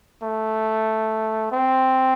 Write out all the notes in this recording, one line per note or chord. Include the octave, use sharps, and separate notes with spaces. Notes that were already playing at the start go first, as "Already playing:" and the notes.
A3
C4